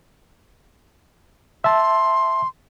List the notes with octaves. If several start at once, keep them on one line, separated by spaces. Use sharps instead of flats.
E5 A5 C6